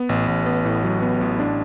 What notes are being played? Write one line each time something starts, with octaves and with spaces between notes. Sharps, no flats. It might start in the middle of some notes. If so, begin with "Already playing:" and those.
Already playing: B3
A1
A1
B3
A2
F#3
B3
A1
D4